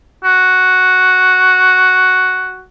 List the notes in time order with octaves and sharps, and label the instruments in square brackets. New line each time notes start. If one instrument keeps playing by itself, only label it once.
[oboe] F#4